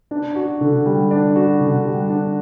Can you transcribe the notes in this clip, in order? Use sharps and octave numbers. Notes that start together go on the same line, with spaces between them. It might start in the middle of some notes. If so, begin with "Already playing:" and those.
D4
F#4
D3
G3
D4
F#4
D3
G3
D4